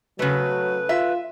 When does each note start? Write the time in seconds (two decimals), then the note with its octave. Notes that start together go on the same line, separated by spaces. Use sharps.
0.19 C#3 F#3 A3 B4
0.89 F4 E5